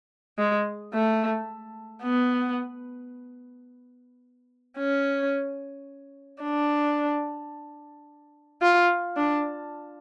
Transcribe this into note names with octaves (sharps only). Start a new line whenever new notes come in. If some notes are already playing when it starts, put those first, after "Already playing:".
G#3
A3
B3
C#4
D4
F4
D4